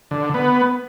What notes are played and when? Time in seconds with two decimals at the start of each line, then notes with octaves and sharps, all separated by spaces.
0.11 D3
0.34 B3